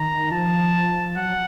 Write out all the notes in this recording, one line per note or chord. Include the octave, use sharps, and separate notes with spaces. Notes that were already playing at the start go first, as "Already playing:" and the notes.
Already playing: D#3 A#5
F3 A5
F#3 F#5